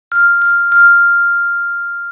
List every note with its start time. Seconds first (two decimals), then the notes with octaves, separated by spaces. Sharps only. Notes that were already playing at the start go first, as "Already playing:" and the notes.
0.12 F6
0.42 F6
0.72 F6